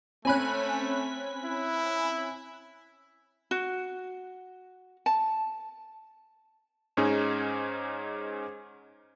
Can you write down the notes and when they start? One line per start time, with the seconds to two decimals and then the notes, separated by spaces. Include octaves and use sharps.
0.25 A3 C4 C#4 G#5 B5 F#6
1.45 E4
3.51 F#4
5.06 A5
6.97 G#2 C#4 D#4 G#4